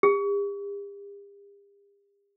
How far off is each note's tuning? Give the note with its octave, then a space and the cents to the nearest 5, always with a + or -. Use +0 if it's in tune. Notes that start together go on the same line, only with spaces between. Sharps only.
G4 +45